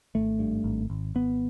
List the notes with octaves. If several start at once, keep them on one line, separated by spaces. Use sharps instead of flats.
G#1 A3
G2
G#1
G#1
G#1 B3